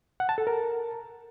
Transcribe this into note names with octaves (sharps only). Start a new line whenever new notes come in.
F#5
A5
A4
A#4